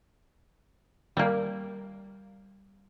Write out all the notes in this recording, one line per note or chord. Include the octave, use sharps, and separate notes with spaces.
G3 A#3